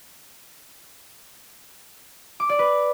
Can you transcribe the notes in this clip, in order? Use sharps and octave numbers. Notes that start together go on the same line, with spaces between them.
D6
D5
B4